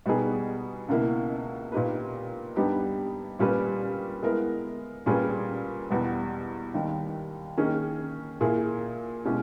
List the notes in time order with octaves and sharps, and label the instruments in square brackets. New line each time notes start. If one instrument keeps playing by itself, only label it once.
[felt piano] B2 G3 B3 D#4 G#4
C#2 B2 A#3 E4
A#2 A#3 D#4 G4 B4
G2 G3 B3 D#4 G4
A#2 G3 C#4 G4 B4
G#3 B3 E4 A#4
A#2 G3 C#4 G#4 B4
E2 B2 G3 B3
D#2 D#3 G3
D#3 A#3 C#4 G#4
A#2 A#3 E4 G#4
B2 G#3 C#4 E4 G4